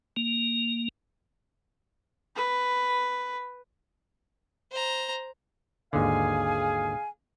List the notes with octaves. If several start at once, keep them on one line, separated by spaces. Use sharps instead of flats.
A#3
B4
C5 A#5
G#1 D#2 D3 G#4 F5 G#5